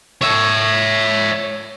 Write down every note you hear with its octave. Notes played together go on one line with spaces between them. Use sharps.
C#5 E5